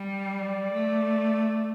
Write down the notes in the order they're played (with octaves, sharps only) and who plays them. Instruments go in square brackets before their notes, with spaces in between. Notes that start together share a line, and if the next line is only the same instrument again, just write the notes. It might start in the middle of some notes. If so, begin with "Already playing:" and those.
Already playing: [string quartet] G3
[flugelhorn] D5
[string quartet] A3